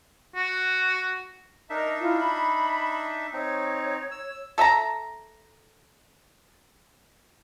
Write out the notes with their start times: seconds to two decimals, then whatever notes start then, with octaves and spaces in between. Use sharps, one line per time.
0.36 F#4
1.70 D4 D#4 A#4 D#5 E5
2.01 E4 F4
2.19 B5
3.33 C4 D#4 C#5
4.11 E6
4.58 A4 E5 A5 A#5